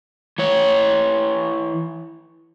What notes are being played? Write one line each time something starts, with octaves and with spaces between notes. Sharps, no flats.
E3 C#5